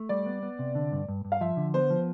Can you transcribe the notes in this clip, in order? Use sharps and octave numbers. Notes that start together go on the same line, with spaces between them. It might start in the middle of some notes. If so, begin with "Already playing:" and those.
Already playing: A3
G3 D5
B3
B3
C3
D3
G2
G2
G2
F5
F3 E5
D3
B3 C5
F3